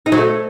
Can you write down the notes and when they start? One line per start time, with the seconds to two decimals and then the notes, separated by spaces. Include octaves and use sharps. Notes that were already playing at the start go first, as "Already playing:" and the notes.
0.06 D#4
0.12 F#3
0.18 A3